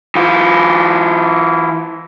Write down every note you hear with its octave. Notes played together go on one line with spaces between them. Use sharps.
E3 F4